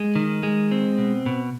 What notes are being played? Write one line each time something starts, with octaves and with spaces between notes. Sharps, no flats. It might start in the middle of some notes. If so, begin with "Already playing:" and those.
Already playing: G#3
D#3
G#3
C4
B2
B2